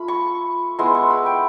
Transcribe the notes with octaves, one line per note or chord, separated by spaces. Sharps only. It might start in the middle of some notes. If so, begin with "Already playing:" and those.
Already playing: A3 F4 B5
C#6
G#3 B3 E4 C6
C#6
B5
G5